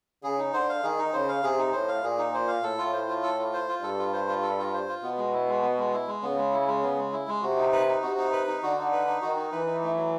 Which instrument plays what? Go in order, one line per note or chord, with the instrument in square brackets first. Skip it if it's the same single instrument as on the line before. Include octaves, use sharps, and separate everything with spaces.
[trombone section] C#3 [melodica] G#4
[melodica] D#4
[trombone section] D3 [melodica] C5
[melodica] F5
[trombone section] D#3 [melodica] G#4
[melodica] D#4
[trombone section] C#3 [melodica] C5
[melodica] F5
[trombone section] C3 [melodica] G#4
[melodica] D#4
[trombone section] A2 [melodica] C5
[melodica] F5
[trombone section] A#2 [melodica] G#4
[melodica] D#4
C5
F5
[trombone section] A2 [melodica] A4
[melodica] F4
C5
F4
A4
F4
C5
F4
[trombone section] G2 [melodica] A4
[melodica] F4
C5
F4
A4
F4
C5
F4
[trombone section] B2 [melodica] B3
[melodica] G#3
E4
G#3
B3
G#3
E4
G#3
[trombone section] C#3 [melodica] B3
[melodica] G#3
E4
G#3
B3
G#3
E4
G#3
[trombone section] C3 [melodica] F#4
[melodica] D#4
B4
D#4
[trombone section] C3 [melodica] F#4
[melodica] D#4
B4
D#4
[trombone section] D3 [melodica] F#4
[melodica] D#4
B4
D#4
[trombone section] D#3 [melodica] F#4
[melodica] D#4
[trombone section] E3 [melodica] B4
[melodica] D#4
A3
F#3